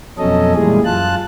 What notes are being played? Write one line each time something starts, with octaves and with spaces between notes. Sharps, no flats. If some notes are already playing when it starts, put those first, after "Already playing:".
F2 B2 F#3 C#4 A4 D#5
A#2 E3 G3 G#3 G#4
F#2 F4 A5 F#6